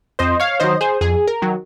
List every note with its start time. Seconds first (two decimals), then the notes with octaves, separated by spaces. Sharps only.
0.19 F2 C5 D#5
0.40 C#5 F5
0.60 D#3 F#3 C5 D#5
0.81 G#4 C5
1.01 F2 G#4
1.28 A#4
1.42 D#3 F#3